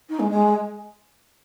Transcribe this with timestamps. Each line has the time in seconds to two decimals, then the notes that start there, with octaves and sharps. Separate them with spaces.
0.09 D#4
0.19 G#3
0.30 G#3